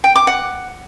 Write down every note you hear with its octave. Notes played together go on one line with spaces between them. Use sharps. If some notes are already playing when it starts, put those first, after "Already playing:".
G5
D6
F#5